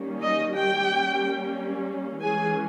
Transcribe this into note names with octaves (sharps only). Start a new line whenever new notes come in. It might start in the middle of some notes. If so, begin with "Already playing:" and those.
Already playing: D#3 G3 A#3 C#4
D#4 D#5
G4 G5
G3 A#3 C#4
E3 G#3 C#4 G#4 G#5